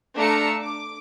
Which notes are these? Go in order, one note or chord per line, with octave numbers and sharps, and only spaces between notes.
A3 D4 F5 A#5 E6 C#7
D6